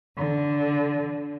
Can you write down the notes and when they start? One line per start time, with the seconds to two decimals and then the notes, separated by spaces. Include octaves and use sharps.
0.18 D3